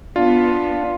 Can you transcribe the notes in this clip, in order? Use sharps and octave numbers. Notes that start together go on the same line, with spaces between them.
B3 D4 F4